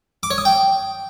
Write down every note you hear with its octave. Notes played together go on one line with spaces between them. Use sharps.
D6
C#5
D#6
G5